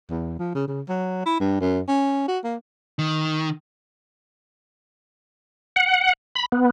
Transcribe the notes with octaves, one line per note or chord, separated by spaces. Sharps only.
E2
F3
C#3
C#3
F#3
E4
G2
F#2
C#4
F#4
A#3
D#3
F#5
B5
B3